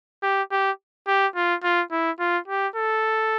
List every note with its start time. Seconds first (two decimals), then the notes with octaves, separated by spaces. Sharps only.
0.23 G4
0.51 G4
1.07 G4
1.35 F4
1.63 F4
1.91 E4
2.19 F4
2.48 G4
2.76 A4